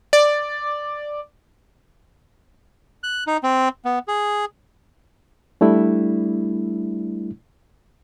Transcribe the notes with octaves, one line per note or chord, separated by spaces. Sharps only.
D5
F#6
D#4
C4
B3
G#4
G3 A3 D4 E4